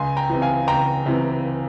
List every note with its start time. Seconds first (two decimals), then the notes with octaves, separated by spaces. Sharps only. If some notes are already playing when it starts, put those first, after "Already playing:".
Already playing: C#2 G#5 C6
0.17 G5 A#5
0.29 C3 E3
0.42 F5 G#5
0.67 C#2 G5 A#5
1.06 C3 E3